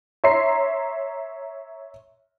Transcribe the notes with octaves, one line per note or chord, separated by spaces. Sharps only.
C#5 E5 A#5 C6 C7